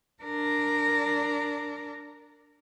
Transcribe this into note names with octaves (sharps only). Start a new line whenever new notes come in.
D4 A#4